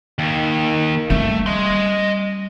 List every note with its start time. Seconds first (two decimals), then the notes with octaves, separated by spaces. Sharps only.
0.19 D#2 D#3
1.10 G3 A3 C#4
1.46 D#5 C6